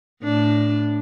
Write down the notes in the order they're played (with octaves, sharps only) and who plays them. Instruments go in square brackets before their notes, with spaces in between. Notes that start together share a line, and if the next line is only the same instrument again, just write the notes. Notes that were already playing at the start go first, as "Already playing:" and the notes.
[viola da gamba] A2 D4